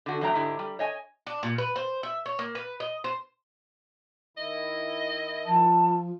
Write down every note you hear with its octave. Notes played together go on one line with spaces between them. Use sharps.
D3 F#4
E2 D3 F#3 A3 G5 A#5
G#2 D3 E4 G4
G3
C#5 D#5 G#5
D4
A#2
B4
C5
E5
C#5
A#3
B4
D#5
C5
D#3 E4 D#5
F3 A5